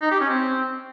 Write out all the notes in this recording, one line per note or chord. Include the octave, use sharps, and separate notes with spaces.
D#4
G4
C#4
C4